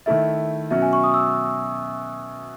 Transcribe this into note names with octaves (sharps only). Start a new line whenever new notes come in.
D#3 A3 E4 E5
B2 F#3 C#4 F#4 E5
G#5
C#6
D#6
E6